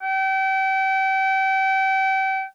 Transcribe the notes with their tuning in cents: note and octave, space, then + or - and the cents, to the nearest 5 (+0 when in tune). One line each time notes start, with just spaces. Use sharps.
G5 -35